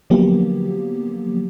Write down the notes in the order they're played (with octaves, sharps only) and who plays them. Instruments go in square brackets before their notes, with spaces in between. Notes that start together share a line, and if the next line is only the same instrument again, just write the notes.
[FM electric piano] D3 F3 F#3 A#3 B3 G4